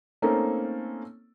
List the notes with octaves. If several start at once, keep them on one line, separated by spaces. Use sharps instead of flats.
A3 A#3 C4 C#4 D#4 A4